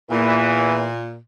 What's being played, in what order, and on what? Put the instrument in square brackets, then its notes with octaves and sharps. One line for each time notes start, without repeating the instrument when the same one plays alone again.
[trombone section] E2 E3 [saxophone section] A#2